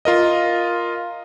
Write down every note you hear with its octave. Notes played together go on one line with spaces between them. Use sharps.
F4 A#4 D#5